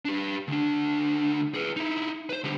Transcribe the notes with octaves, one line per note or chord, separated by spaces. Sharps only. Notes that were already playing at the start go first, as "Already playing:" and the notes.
D4 G4
D2 D4
G#4 B4
D#4 E4
B4 C5
D3 G4